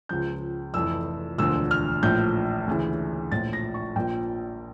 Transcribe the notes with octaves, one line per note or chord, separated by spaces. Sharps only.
C#2 C#3 F3 G6
F1 F2 E3 E6
E1 D2 D3 F3 E6
F6
A#1 A2 F3 G6
D2 C#3 E3
A#1 A2 F3 A6
A#6
C#6
A#1 A#2 F3 G5